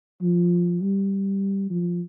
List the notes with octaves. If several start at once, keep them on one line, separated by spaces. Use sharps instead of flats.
F3
G3
F3